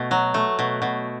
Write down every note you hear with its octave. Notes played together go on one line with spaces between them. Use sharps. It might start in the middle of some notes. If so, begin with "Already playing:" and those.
Already playing: B2 A3
F#3
A3
B2
B2